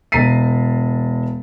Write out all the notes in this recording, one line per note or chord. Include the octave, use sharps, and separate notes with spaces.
E1 A#5 A6 B6 C7 D#7